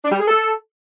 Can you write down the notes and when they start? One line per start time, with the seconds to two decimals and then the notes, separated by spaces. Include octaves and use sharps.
0.04 D4
0.12 G3
0.19 G#4
0.27 A4